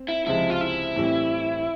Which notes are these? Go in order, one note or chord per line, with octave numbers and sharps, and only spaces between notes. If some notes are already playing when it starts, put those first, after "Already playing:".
Already playing: C4
E4
C#2 C3 F3 G#3 C4 E4
F4
E4
A2 E3 G3 C4